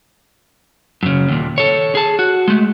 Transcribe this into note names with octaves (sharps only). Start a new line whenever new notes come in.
F#2 C#3
D#2 A#2
A4 C#5
G#4 A5
F#4
G#3 A3